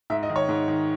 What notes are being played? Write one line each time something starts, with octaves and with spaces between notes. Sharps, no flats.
G#2 E5
D#5
D#3
C#5
G#2
D#3